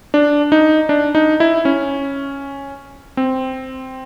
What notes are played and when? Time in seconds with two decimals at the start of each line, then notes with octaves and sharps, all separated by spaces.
0.14 D4
0.52 D#4
0.89 D4
1.15 D#4
1.40 E4
1.65 C#4
3.17 C4